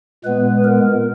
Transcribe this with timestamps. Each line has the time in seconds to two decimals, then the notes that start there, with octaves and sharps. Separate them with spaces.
0.24 A#2 G#3 B3 B4
0.65 A#4